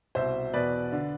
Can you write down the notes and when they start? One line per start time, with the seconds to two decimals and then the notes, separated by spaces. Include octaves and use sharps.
0.15 C2 B2 C5 E5
0.53 E2 B2 B4 D5
0.92 D3